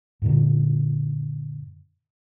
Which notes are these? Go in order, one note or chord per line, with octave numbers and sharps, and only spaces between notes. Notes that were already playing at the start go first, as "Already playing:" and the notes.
F#2 A#2 D3